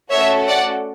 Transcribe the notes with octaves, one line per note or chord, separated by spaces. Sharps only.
A3 C#4 F#4 A4 C#5 E5
D5 F#5